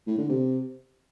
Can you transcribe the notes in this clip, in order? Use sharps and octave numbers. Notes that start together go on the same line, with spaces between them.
A2
D3
C3